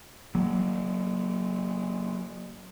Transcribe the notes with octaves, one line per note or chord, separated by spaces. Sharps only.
F#3 A#3